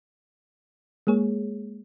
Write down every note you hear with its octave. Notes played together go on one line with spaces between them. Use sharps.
G#3 A#3 G#4 C#5